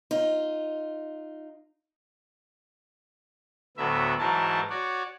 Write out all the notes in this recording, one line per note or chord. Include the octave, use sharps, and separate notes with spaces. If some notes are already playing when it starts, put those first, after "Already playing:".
D#4 F4
D2 A2 F#3 B3 E5
G#2 E3 F#3 A#4 A5
F#4 C#5 D5